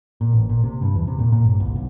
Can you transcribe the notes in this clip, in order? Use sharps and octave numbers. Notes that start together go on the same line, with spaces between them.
A#2
A1
A#2
C3
G2
E2
C3
A#2
A#2
G1
C2
B1